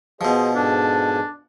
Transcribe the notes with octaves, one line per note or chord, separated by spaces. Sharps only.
B2 F3 G#4 C5 D#5
G#2 D4 A4 G#5